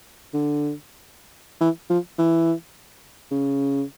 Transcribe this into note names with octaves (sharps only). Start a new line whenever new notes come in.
D3
E3
F3
E3
C#3